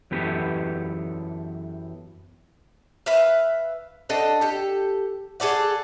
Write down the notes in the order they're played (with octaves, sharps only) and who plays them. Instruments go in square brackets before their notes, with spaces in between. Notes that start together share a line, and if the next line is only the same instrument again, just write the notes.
[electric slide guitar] F#2 E3 B3 G4 A4
[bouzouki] B4 E5 F5
D4 A4 D#5 F#5
G4 A4
G#4 A4 D5 F#5